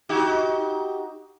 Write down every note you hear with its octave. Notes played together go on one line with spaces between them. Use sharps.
D#4 F#4 G4